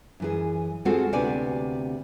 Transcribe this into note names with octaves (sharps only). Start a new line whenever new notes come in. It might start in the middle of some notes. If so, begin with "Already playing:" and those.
F#2 E3 G#4
G#3 C4 F4 F#4 G#4 A4
D2 C3 B3 D4 D5 G#5